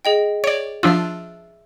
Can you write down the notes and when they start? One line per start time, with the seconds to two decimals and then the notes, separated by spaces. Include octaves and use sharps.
0.05 G#4 D#5 G5
0.44 C#5 D5 D7
0.83 F3 D4 F4 E5 E6